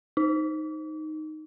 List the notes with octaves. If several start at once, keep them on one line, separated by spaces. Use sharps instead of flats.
D#4